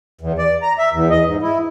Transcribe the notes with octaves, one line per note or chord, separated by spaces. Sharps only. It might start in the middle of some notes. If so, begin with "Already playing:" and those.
E2
D5
A#5
E5
E2
D#5
G#2
E4